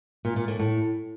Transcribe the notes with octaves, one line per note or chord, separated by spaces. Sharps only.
A#2
A#2
A2
A2